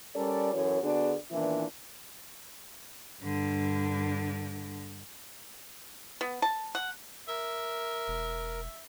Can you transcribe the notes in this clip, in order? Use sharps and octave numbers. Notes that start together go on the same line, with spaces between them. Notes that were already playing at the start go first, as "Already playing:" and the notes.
G3 C#4 A4 A#4 D5
F#2 E3 F#4 A4 C#5
D3 B3 D4 F#4 G#4
A#2 D#3 E3 B3 D4 E4
G2 D3
B3
A5
F#5
A#4 E5
E1